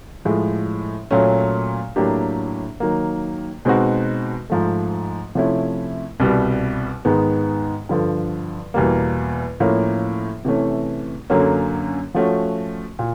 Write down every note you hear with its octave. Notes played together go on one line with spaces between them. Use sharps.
A2 F3 G#3
A#2 F#3 A3 C#4
A2 F#3 A#3 D4 G4
D#3 F#3 A#3
B2 G#3 C4 D#4 F#4
G#2 F3 A3
C3 F3 A3 C#4 E4
C2 B2 G3
G#2 D#3 G#3 B3
G2 D3 F3
E2 B2 G3 A#3
A2 F3 A#3 C#4
C3 E3 A3 C#4
F#2 D3 F#3 A#3 C#4
F3 A3 C#4 F#4
A#2